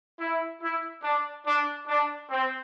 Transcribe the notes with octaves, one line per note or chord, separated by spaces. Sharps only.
E4
E4
D4
D4
D4
C4